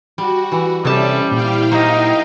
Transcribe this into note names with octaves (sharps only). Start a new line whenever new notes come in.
G3 F#4
E3
C3 G3 C4 C#4 A4 D5 E5 A5
A#2 E4 F5 G5
F#3 A#3 D#4 C5